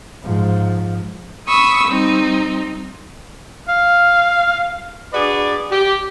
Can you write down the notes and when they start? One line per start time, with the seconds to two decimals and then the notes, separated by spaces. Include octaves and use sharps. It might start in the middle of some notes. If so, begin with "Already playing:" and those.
0.23 G#2 F3
1.47 B5 C#6 D#6 E6
1.87 G3 C4 D#4
3.68 F5
5.13 D4 F#4 G#4 B4 D5
5.71 G4